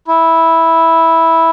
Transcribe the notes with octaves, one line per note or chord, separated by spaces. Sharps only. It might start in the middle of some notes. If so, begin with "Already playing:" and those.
E4